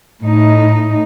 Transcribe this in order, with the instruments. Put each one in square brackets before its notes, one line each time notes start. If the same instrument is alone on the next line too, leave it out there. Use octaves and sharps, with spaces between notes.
[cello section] A2 D#4